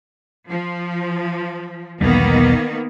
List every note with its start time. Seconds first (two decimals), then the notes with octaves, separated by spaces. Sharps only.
0.47 F3
2.01 B1 E2 D#3 G3 A#3 B3